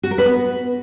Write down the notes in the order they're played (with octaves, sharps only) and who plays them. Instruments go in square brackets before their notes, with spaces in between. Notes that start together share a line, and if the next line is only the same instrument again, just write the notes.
[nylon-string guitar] F#4
A#4
B4
B3